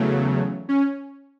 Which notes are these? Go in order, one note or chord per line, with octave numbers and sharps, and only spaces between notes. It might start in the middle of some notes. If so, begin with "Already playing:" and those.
Already playing: E2 C#3 F#3 A3
C#4